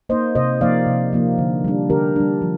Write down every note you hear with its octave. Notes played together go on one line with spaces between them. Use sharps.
A#3 D#4 C5 D#5
C3 C5 D#5
F3 A#3 D#4 D5 F5
C3
F3 A#3 D#4
D3
G3 D4
D3 G4 A#4
G3 D4
F3